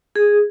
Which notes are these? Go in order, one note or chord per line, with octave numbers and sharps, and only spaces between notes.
G#4